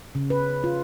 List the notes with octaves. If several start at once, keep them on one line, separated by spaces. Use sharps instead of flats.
C#3
B4
F4